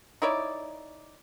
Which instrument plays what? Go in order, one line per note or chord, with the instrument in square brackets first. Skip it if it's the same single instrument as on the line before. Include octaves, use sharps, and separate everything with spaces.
[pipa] D#4 E4 C#5 D5